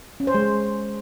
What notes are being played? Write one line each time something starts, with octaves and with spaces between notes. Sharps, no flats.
C#4
C5
G#3